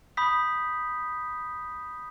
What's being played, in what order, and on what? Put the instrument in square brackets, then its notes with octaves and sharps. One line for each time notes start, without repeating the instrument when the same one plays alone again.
[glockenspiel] B5 D#6 G6 B6